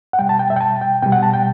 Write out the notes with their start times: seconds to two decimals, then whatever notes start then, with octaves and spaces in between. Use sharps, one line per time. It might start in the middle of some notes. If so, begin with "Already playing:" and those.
0.13 F#5
0.19 B2 G3 G5
0.29 A5
0.39 G5
0.50 E5
0.56 G5
0.61 A5
0.81 G5
1.02 B2 G3 G5
1.12 F#5
1.23 A5
1.34 G5